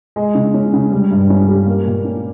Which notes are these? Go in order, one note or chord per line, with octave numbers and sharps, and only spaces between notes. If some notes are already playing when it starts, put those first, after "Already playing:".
G#3
C#3
C#4
C#3
G3
G2
C#4
G4
A#3
A#2
C#4